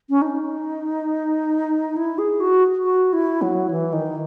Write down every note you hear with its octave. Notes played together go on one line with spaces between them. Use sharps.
C#4
D#4
E4
G#4
F#4
F#4
E4
F#3
E3
D#3